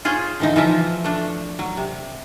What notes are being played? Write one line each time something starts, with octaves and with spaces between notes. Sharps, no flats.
F4 G#4 C5 C#5
D3 E3 D#4
E3 F3 F4 E5
A3 D4
F#3
C3